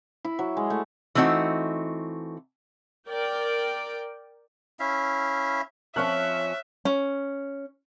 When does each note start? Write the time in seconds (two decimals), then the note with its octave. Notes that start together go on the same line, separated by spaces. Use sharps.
0.25 E4
0.39 F#3
0.57 G#3
0.70 A3
1.15 E3 A3 C4 D#4 F#4
3.08 A#4 D5 G5
4.80 C#4 E4 E5 F5
5.96 F3 C4 C#4 C#5 E5 C#6 F6 F#6
6.85 C#4